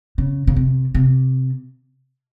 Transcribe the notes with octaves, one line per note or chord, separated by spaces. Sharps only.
C#3
C#3
C3
C3